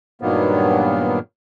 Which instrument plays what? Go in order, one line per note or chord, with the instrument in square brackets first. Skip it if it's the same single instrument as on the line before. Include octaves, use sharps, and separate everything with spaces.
[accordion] G2 A#2 D#3 F#3 A#3 B3